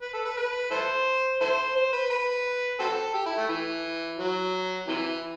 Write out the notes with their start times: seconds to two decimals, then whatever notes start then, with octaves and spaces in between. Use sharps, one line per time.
0.02 B4
0.13 A4
0.25 B4
0.37 B4
0.71 E4 A4 C5
1.41 E4 A4 C5
1.75 C5
1.93 B4
2.10 B4
2.80 C4 F#4 A4
3.14 G4
3.26 E4
3.37 A3
3.49 E3
4.19 F#3
4.88 C3 E3